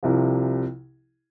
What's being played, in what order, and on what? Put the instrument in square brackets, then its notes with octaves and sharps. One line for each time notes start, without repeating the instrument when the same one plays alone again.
[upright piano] C2 C3 F3